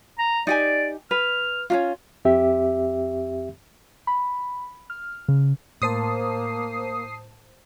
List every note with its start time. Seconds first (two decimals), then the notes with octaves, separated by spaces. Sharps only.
0.19 A#5
0.47 D#4 G4 D5 G#5
1.11 B4 F6
1.70 C#4 D4 F4
2.25 F2 C4 G4 E5
4.07 B5
4.90 F6
5.29 C#3
5.82 A2 A#3 C5 A5 D#6 C7